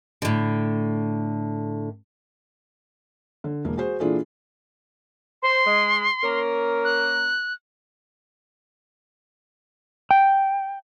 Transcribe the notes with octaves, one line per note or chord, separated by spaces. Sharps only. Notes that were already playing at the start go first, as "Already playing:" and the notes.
A2 D3
D3
E1 A#3
F#4 G#4 C5
A#2 E3 D4 F4 G#4 A4
C5 C6
G#3
A#3 C#4 A#4
F#6
G5